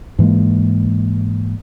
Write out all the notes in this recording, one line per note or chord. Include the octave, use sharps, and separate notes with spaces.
G#2 E3 G#3 A#3